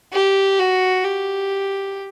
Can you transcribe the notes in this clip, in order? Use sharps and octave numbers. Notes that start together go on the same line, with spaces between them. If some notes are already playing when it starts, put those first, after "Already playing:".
G4
F#4
G4